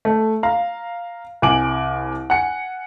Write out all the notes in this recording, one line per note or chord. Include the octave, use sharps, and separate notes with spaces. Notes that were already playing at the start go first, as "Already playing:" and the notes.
A3
F5 A#5
C2 G#5 D6 D7 F#7
F#5 G#5 C#7